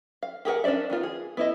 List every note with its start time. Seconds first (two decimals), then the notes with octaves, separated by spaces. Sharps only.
0.23 F5
0.45 G4 G#4 A#4 F#5
0.64 C#4 D4 C5 D5 E5
0.90 D#3 B3 F4
1.03 G#4
1.37 B3 E4 D#5